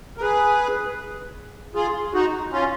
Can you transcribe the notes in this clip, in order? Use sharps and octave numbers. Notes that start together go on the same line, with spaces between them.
A#4
G#4 B4
F4 G#4
D#4 F#4
C#4 F4